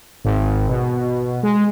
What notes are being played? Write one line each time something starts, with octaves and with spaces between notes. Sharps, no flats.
G#1
B2
G#3